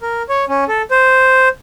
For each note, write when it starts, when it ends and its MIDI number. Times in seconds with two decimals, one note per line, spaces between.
0.01 0.22 70
0.29 0.45 73
0.49 0.64 61
0.68 0.82 69
0.91 1.49 72